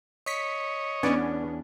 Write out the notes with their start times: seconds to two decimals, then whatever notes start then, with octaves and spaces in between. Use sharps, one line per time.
0.26 C#5 D#5 B6 C#7
1.03 E2 B3 C#4 D4 D5 G#5